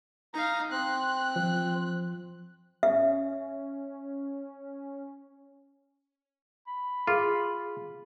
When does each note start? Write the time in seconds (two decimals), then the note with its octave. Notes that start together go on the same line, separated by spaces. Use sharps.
0.34 D#4 F5 A#5
0.71 C4 F#6
1.36 F3
2.83 C#4 E5
6.67 B5
7.07 F4 G#4